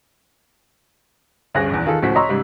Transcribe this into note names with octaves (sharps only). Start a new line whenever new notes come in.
D2 G2 C#4 G#4 F#6 A#6
A#1 E2
D#3 F4 G#4 A4
C#2 A2 F3 F#4 B6
C#5 D#5 A#5 C6 C#6 E6
G#2 C#3 G3